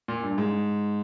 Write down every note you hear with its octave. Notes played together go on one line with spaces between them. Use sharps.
A#2
G2
G#2